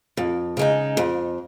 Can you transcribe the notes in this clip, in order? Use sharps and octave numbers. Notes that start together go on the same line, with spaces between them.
F2
C#3 G#3 D#4
F2